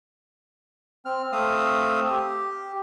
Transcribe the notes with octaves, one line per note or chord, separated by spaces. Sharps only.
C4 F6
A3 C4 F5 D#6 E6
G4